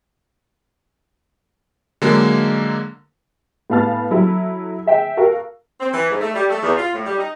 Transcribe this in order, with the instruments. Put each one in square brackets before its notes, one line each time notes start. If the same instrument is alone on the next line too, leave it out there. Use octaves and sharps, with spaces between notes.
[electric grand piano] D3 F#3 G#3 A#3
[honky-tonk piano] A2 B3 F5 A5 F6 A6
F#3 E4 A4
G#4 E5 G5
F#4 A4 A#4 F5
[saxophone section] C4
E3
G#2
A3
G3
A3
E2
F4
A2
G3
D#4